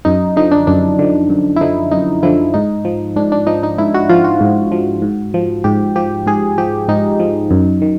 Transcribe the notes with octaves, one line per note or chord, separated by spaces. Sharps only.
F#2 D#4
D3 F3 D#4
D4
F#2 D4
D3 F3
F#2
E4
D3 F3 D#4
F#2 D#4
D3 F3 E4
G#2 D#4
F3
G#2 D4
D4
F3 D#4
D#4
G#2 E4
F#4
F3 F4
F#4
G#2
F3
G#2
F3
G#2 G4
F3 G4
G#2 G#4
F3 G4
G#2 D#4
F3
F#2
D#3